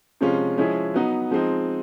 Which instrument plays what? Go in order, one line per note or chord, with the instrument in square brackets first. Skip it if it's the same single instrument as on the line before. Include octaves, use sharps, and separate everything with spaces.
[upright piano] C3 F3 G#3 C#4 F4
F3 G#3 C#4 E4 G#4
F#3 B3 D#4
F3 G#3 C4 D#4